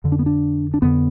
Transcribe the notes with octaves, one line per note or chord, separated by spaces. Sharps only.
F2 D3
D4
B3
D4
D4
F2 D3 B3